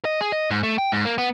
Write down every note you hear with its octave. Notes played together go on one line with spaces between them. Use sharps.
D#5
G#4
D#5
G#2
A3
G5
G#2
A#3
B3